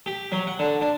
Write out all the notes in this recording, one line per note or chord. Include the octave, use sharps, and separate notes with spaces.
G4
F#3
F#5
D3
D4